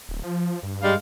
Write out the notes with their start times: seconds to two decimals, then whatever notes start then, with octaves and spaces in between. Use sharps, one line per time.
0.09 D1
0.23 F3
0.63 G2
0.82 G3 G#3 F5